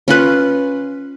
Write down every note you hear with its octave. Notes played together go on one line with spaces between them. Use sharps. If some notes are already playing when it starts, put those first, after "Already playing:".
C#4 F4 B4